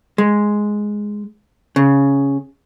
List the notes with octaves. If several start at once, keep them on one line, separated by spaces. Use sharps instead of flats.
G#3
C#3